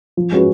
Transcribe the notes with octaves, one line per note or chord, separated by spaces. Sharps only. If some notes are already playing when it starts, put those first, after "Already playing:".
F3
G#3 C#4 F#4 B4